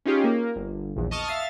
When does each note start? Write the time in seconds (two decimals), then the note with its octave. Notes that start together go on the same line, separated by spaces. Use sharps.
0.05 C#4 D#4 F4 G4 G#4
0.24 A#3
0.55 G1
0.96 A#1 E2
1.11 D#5 A5 C#6 D#6 F6
1.28 E5 F5 A6